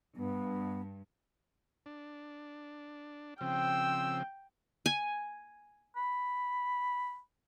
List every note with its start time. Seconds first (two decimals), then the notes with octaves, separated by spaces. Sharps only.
0.16 G2 B3
1.86 D4
3.41 C#3 F3 C4 G5 E6
4.86 G#5
5.96 B5